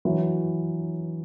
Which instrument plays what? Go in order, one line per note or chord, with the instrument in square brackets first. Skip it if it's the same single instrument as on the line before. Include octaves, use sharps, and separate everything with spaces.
[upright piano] E3 F#3